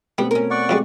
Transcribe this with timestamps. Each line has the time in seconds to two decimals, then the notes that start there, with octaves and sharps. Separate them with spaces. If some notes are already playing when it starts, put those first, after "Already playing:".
0.18 B2 G3 A3 B3 C4
0.31 C#4 A#4
0.51 D5 F#5 C#6
0.69 F2 G3 G#3